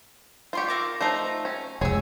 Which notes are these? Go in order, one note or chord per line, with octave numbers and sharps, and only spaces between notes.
F4 G4 C5 C6 C#6
C4 A#4 D6
F3 A3 D#4 C5 A#5
C#4
F1 C#2 G#4 C#5 G#5 E6